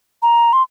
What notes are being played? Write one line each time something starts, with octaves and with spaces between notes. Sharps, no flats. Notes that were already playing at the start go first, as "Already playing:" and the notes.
A#5
C6